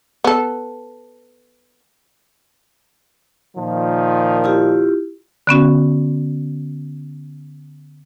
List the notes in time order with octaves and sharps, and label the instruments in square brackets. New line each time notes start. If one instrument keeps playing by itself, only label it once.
[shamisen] B3 A4
[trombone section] A#2 D#3 F3
[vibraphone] E4 F4 G4
[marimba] D3 B3 C#4 F#4